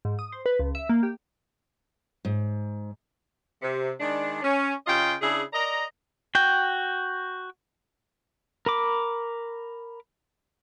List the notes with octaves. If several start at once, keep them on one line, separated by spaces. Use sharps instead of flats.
G#2
D#6
C5
B4
C#2
E5
A#3
G4
G#2
C3
D#3 G#3 D4
C#4
C#3 C#4 F4 D#5 G5
C#3 D4 E4 G#4
A#4 D5 D#5 A#5
F#4 G5
A#4 B5 D6